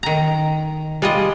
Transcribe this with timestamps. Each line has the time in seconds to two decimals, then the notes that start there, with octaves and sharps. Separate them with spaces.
0.03 D#3 A#5
1.02 G3 G#3 F4 D#5